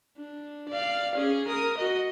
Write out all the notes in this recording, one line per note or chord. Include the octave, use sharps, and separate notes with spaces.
D4
D5 F5
C#4 G#4
A#4 D#6
F#4 D#5